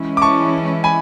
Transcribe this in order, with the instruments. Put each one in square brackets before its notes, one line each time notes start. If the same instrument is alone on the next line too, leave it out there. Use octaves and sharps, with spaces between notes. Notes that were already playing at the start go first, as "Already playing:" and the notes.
Already playing: [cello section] E3 G#3 C#4 E4
[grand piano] D6
A5 C#6
G#5 B5